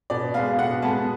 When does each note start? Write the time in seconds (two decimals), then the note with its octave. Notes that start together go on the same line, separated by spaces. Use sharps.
0.10 B2 D5
0.34 G#3 B3 F5
0.59 B2 F#5
0.82 G#3 B3 A5